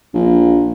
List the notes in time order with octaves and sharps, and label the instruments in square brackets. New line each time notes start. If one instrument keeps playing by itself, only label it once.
[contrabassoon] A#1